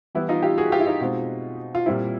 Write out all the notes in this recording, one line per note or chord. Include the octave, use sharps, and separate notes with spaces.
E3 G3 B3 E4
D#4 F4
F4 G4
F#4 G#4
F4 G4
E4
D#4 F4
B2 G#3 C4
F4
A#2 G3 C4 E4